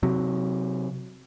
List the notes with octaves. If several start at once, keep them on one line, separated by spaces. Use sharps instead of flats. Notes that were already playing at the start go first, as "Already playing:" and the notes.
C3 F#3